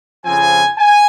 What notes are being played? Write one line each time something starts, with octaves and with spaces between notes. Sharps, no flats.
F2 C#3 F3 C4 G#5
G#5